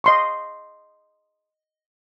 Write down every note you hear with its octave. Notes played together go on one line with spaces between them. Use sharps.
D#5 C6 C#6